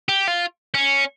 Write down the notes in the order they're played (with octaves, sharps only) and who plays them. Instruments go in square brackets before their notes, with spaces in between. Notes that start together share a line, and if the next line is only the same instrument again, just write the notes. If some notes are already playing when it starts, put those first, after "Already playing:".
[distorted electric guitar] G4
F4
C#4